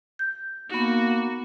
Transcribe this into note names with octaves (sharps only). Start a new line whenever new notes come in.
G6
A#3 B3 D#4 F#4